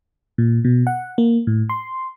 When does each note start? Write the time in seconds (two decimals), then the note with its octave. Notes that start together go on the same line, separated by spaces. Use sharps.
0.38 A#2
0.65 B2
0.87 F#5
1.18 A#3
1.47 A2
1.70 C6